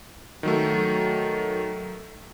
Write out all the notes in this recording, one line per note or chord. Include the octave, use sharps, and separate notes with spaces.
D#3 F#3 A3